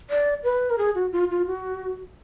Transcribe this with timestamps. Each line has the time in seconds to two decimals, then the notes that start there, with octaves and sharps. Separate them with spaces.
0.10 D5
0.44 B4
0.70 A#4
0.78 G#4
0.95 F#4
1.12 F4
1.30 F4
1.47 F#4